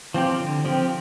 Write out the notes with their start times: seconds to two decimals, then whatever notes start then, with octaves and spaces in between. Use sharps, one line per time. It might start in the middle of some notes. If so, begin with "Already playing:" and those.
0.14 F3 C4 G4
0.40 D3
0.65 F3 C4 G4